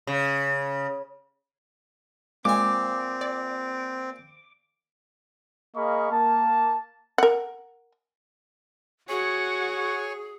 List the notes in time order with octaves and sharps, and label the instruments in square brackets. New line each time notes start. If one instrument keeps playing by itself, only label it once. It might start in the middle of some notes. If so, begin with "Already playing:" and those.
[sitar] C#3
[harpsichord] A#2 G#5 [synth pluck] G#3 [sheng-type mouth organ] C4 [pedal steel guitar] D6
[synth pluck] D5
[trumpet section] A#3 G#4 D#5 F5 B5 C#6
A#3 A5
[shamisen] A#4 F#5
[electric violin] F#4 F#5 [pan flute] G#4 [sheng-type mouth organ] C#5 G#5 C#6